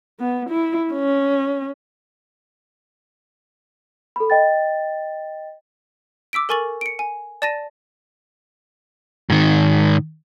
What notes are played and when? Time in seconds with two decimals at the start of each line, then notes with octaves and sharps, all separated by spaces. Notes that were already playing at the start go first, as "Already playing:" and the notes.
0.19 B3
0.49 E4
0.93 C#4
4.16 A4 B5
4.30 D#5 G5 A6
6.33 D6 E6 B6 D7
6.49 A4 A#4 G#5 C#6 A6 F#7
6.81 C#7 D7
6.99 G#5
7.42 D5 A5 A6 A#6 D#7
9.30 G#2 D#3